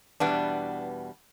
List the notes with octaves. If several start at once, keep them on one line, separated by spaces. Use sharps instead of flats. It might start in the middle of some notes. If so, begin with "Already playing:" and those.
E2 B2 G3 B3 D4